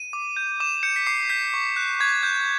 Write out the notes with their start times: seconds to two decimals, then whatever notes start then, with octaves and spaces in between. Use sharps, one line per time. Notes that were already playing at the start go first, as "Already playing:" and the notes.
Already playing: D#7
0.13 D6
0.37 G6
0.60 D6 E7
0.83 G6 C#7
0.96 B6
1.06 D6 C7
1.29 G6 B6
1.54 C#6
1.76 F#6
2.00 C#6 G#6
2.23 F#6 G6